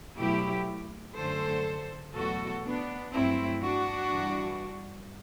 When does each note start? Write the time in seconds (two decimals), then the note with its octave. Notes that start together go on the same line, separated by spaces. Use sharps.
0.18 B2 F#3 A3 E4 G4
1.16 F#2 D3 A3 A4 C5
2.14 E2 B2 F#3 A3 F#4 A4
2.64 B3 D4
3.13 G2 F#3 A3 C4 E4
3.62 D4 F#4
4.11 G2 E3 G3